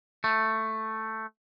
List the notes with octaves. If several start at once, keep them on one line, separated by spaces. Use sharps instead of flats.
A3